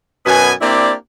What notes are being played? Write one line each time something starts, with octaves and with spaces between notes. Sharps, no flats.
F#2 B2 B3 B4 G#5
A#3 C4 D4 E4 G4 D5